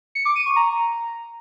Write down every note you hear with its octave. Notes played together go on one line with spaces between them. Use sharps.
C#7
D6
D#7
C#6
A#5